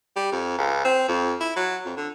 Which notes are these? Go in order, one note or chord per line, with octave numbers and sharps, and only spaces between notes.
G3
F2
C#2
C4
F2
E4
F#3
F2
D3